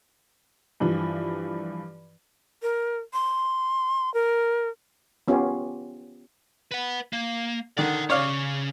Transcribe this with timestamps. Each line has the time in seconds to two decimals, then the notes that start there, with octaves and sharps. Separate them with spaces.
0.80 G2 E3 F3
2.62 A#4
3.13 C6
4.14 A#4
5.28 B3 C#4 F4 G4
6.71 B4 F#5
7.13 A#3
7.78 D3 D#3 D5 F#5
8.10 C#3 C#4 C#5 D5 F5